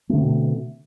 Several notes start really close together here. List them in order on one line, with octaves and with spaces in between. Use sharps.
A3 D3 C4 B2